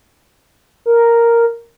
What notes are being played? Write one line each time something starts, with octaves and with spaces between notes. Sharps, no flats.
A#4